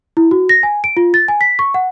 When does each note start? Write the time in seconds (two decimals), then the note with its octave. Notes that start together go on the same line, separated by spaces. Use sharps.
0.17 E4
0.31 F#4
0.49 A#6
0.63 G#5
0.84 D7
0.97 F4
1.14 A6
1.28 G#5
1.41 B6
1.59 C#6
1.74 F#5